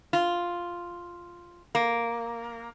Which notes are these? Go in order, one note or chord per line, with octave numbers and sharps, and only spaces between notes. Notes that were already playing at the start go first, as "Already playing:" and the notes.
F4
A#3